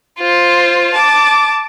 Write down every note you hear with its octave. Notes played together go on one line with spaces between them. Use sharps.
F4 C5
A5 D6